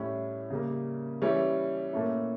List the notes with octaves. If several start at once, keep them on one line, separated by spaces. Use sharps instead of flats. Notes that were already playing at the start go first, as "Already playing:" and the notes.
Already playing: A2 G3 C#4 E4
C#3 G3 A#3
E3 G3 C#4 E4
A#2 A3 C#4 E4